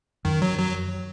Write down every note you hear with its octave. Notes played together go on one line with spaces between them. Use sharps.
F#2 D#3
F#3
F#3